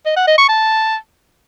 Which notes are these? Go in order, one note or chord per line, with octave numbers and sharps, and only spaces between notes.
D#5
F#5
D#5
C#6
A5